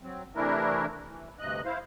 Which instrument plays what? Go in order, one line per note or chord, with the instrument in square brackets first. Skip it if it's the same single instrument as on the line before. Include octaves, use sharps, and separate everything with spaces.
[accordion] F#3 C4
C3 E3 A3 D4 E4 A#4
E3
D2 G2 C3 D#5 F#6
E4 C5 F5